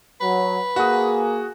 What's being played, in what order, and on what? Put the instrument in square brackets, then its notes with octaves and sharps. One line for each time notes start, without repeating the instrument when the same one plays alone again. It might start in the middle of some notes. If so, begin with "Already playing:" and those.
[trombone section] F#3 [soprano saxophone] B4
[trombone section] A#3 G#4 [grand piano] F#4 D#6